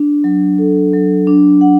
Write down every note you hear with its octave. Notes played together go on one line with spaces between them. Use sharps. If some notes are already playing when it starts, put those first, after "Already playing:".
Already playing: D4
F#3
A4
F#3
D4
F#5